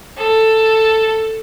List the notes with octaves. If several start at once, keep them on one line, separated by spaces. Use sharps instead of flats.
A4